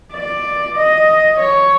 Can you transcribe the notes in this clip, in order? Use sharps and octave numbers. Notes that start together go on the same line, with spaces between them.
D5
D#5
C#5